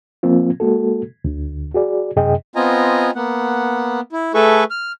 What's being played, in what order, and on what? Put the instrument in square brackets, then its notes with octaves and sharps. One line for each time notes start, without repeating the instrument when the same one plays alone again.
[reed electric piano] F3 A#3 C4 F4
G#3 A#3 F#4 A4
D2 D3
F#4 G#4 D5
F#2 C3 G#4 D#5 G5
[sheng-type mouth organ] B3 C4 F4 D#5 G#5 A#5
A#3 B3 F#5
E4
A3 G#4 A4 B4 E5 C#6
F6